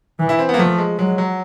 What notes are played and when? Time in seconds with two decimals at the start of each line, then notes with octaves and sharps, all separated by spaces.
0.19 E3
0.29 E4
0.39 C4
0.49 A#3 B3
0.58 F3 A3
0.78 G#3
0.99 F#3 G#3
1.18 F#3